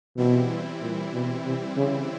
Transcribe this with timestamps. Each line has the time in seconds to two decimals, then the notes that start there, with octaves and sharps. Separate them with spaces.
0.17 B2 E3 G3 C4 E4
0.81 A#2
1.13 B2
1.45 C3
1.77 C#3